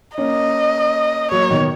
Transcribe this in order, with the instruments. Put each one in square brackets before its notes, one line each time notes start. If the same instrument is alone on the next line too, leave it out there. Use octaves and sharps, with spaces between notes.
[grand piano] A#3 C#4 [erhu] D#5
[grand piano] F#3 A#3 [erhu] C#5
[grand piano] B2 D#3